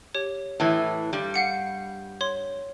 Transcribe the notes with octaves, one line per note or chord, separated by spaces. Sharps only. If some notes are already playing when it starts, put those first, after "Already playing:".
G4 C#5
A2 E3
G2 G3
F5 F#5 C#7
C#5 C6